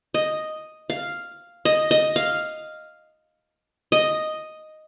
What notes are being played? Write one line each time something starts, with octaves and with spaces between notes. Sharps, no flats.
D#5
F5
D#5
D#5
F5
D#5